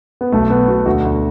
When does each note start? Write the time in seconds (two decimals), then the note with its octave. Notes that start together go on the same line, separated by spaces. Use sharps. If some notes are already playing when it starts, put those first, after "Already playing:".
0.21 B3
0.32 B1 A3
0.50 B2 B3
0.68 B2 F#4
0.86 D2 F#4
1.05 D2